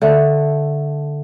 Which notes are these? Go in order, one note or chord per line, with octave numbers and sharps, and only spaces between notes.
D3 A3